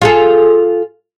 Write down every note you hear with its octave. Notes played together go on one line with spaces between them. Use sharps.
F4 G#4 A4